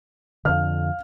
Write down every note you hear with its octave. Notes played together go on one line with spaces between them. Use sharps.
F2 D3 F5 F6